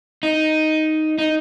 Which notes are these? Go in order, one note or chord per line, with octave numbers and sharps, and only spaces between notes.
D#4
D#4